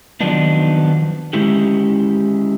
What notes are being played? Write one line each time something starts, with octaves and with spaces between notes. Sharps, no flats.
D#3 F3 F#3 B3 D4 D#4
G#3 C#4 E4 G4